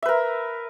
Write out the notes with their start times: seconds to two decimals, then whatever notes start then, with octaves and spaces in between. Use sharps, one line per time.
0.02 E5
0.06 B4
0.09 A#4